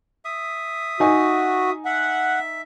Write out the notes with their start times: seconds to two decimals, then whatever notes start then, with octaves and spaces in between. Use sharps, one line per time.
0.25 E5 D#6
1.00 D#4 F#4 G#5
1.85 E5 F#5